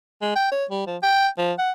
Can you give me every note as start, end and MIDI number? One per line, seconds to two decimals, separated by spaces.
0.22 0.35 56
0.36 0.49 79
0.52 0.65 73
0.71 0.86 55
0.87 0.97 53
1.03 1.27 79
1.38 1.52 53
1.59 1.71 78